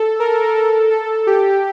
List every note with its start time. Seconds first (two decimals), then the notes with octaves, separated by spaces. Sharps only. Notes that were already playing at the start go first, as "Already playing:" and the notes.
Already playing: A4
0.20 A#4
0.55 A4
0.91 A4
1.27 G4